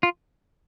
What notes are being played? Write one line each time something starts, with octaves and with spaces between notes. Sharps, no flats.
F4